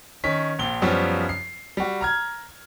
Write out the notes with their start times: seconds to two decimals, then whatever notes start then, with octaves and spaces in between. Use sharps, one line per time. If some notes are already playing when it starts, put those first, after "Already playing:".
0.24 D#3 C#4 B6
0.59 A#1 A#2 G7
0.82 F#2 F3 G3 B3 C#4
1.29 C7
1.77 G3 F#4
2.01 A#5 F6 G#6